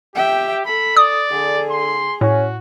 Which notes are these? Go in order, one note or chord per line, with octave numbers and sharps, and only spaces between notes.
G4 E5 G5
A4 B5
D5 D#6
D3 G#4
C6
A2 C#4 F#4